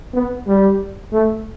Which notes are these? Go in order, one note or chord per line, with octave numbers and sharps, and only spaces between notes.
B3
G3
A3